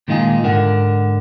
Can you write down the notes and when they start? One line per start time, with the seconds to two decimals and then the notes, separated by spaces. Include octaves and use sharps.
0.08 A#2 D#3 G#3 D#4 F4 G#4
0.43 G#2 D3 A#4 F#5